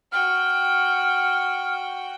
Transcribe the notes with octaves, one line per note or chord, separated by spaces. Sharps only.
F#4 G5 F6